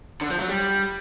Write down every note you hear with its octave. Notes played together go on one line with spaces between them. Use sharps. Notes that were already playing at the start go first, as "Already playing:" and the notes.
D3
F3
F#3
G3